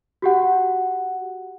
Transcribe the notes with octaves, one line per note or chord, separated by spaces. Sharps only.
F#4 G4 F#5